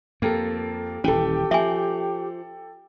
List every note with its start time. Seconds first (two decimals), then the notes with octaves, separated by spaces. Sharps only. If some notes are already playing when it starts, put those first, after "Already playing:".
0.22 F2 A#3 G4 A4
1.04 D#1 E3 C#4 G4 A4 G5
1.51 F3 E5 G#5